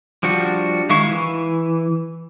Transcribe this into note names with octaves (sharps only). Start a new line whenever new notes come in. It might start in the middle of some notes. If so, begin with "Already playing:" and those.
F3 G3 D4 F#4
D#3 G#3 E4 F5 C#6
E3